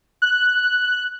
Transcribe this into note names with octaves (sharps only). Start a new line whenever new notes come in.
F#6